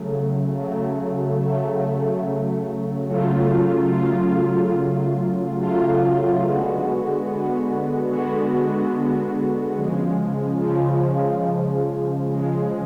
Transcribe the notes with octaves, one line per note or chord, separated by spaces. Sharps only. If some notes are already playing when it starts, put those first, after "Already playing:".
Already playing: C#3 F#3 A3
C#3 F#3 A3
C#3 F#3 A3
C#3 F#3 A3
C#3 F#3 A3 F4
C#3 F#3 A3 F4
C#3 F#3 A3 F4
C#3 F#3 A3 F4
D3 G#3 B3 F#4
D3 G#3 B3 F#4
D3 G#3 B3 F#4
D3 G#3 B3 F#4
C#3 F3 G#3
C#3 F3 G#3
C#3 F3 G#3
C#3 F3 G#3